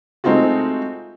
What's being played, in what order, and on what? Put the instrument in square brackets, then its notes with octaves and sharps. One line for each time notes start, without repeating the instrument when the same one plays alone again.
[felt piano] G#3 A3 C4 D#4 F4 F#4